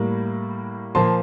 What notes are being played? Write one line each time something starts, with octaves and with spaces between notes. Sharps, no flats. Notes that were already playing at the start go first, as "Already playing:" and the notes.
Already playing: A2 G3 A#3
A#2 F3 A#3 A5 C6